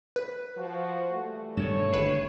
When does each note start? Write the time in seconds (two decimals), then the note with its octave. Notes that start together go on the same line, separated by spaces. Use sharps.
0.16 B4
0.57 F3 F#4
1.12 E3 G3 A3
1.57 G2 B2 D#3 C#5 E7
1.92 G#1 D3 B4 C7